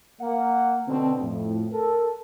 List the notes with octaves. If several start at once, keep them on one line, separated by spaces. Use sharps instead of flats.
A#3 F#5
B2 D3 C4
F2 A2
A4 A#4